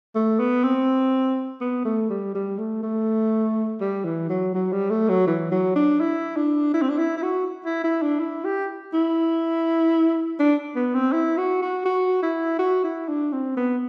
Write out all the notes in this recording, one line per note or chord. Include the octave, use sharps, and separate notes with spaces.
A3
B3
C4
B3
A3
G3
G3
A3
A3
G3
E3
F#3
F#3
G3
A3
F#3
E3
F#3
D4
E4
D4
E4
C4
D4
E4
E4
F#4
E4
E4
D4
E4
G4
E4
D4
B3
C4
E4
F#4
F#4
F#4
E4
F#4
E4
D4
C4
B3